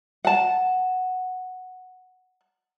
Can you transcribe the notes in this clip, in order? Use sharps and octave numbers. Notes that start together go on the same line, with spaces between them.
F#5 A5